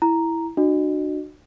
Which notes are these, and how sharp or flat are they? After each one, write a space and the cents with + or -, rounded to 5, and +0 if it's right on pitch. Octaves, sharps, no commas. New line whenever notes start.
E4 +0 A#5 +0
D4 +40 F#4 +0 D#5 -35